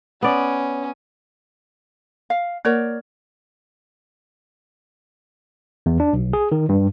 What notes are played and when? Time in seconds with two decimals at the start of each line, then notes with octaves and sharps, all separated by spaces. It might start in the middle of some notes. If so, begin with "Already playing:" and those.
0.22 B3 C#4 D5
2.30 F5
2.65 A#3 A#4 C#5 D5
5.86 E2
6.00 D4
6.13 B1
6.33 G#4
6.52 D#3
6.69 G2